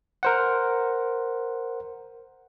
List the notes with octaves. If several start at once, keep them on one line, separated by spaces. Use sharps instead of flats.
A#4 C5 F#5